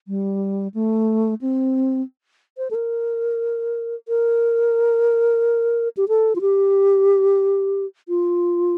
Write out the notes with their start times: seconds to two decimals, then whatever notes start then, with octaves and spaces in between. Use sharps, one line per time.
0.08 G3
0.74 A3
1.41 C4
2.58 C5
2.71 A4
2.75 A#4
4.08 A#4
5.97 G4
6.08 A4
6.36 F4
6.41 G4
8.09 F4